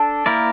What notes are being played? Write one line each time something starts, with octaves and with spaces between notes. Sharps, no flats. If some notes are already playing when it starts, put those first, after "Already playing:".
Already playing: D4 A4
A#3 E4 A#4 D5